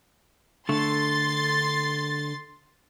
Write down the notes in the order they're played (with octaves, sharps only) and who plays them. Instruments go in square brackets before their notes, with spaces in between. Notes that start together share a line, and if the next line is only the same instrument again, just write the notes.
[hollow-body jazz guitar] D3 A3 [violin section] C6 A6